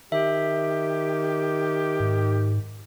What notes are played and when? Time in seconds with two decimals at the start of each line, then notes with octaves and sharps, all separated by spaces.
0.12 D#3 G4 E5
2.00 G#2